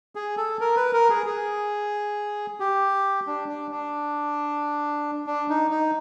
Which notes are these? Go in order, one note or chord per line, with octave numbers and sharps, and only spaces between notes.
G#4
A4
A#4
B4
A#4
G#4
G#4
G4
D4
D4
D4
D4
D#4
D#4